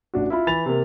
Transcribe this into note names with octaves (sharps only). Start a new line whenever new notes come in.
A1 D4 F#4
E4 F4 B5
E3 B4 B5 A6 F7
C3 A#3